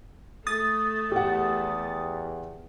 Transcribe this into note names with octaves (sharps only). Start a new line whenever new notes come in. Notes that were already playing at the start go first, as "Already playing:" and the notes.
A3 D#6 A6
E2 G4 F#5